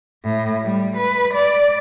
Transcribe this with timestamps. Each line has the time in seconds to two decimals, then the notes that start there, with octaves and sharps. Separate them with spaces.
0.24 A2
0.63 G3
0.97 B4
1.34 D5